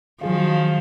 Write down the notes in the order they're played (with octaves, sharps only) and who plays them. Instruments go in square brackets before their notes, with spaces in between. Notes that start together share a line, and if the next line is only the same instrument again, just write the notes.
[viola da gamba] D#3 F3 [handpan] F#3 G#4 F5